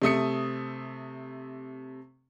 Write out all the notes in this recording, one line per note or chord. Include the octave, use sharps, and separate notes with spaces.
C3 A3 D#6 C#7